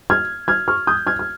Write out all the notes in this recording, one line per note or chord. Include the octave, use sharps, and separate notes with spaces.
F6 G#6
F6 G#6
C#6 F6
D#6 G6
F6 G#6
F6